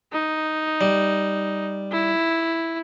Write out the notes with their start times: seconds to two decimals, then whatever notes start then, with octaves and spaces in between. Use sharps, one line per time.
0.13 D#4
0.81 G3
1.92 E4